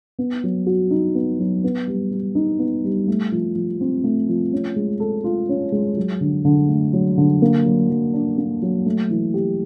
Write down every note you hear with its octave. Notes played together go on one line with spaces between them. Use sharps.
B3
F#3
F#4
D#4
B3
F#3
B3
G3
G3
D#4
B3
G3
A3
F3
F3
C4
A3
F3
C#4
G#3
A4
F4
C#4
G#3
F#3
D3
D3
A3
F#3
D3
A#3
F#3
F#3
D4
A#3
F#3
A3
E3
G4